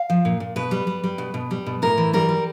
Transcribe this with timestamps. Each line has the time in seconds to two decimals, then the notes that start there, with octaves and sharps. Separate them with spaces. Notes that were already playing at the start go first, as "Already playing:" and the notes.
Already playing: F5
0.10 F3
0.25 A#2
0.40 A#2
0.56 B2 B4
0.71 G3
0.87 G3
1.04 G3
1.18 B2
1.34 B2
1.51 G3
1.66 B2
1.82 A2 A#4
1.98 E3
2.13 G3 A#4
2.29 G3